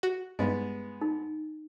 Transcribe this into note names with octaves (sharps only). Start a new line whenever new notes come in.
F#4
G2 G#3 B3 D#5
D#4